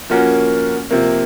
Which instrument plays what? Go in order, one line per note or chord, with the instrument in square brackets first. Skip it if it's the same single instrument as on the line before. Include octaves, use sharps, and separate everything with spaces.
[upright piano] F3 A#3 C#4 F#4 A#4
C3 F3 A#3